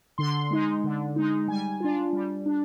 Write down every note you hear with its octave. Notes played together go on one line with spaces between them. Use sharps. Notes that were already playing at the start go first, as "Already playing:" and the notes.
D3 C6
G#3 D#4
D3
G#3 D#4
G3 G#5
D4 F4
G3
D4